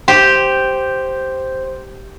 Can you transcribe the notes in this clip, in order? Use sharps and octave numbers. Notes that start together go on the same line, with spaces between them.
G4 C5